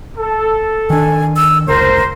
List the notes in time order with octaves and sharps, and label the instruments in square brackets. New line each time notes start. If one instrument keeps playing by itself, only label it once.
[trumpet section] A4
[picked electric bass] D#3 D4 [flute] G#5
[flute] E6
[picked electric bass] F1 C#2 [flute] A#4 [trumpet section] C5